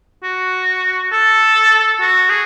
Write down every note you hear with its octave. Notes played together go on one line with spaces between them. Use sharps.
F#4
A4
F#4
G#4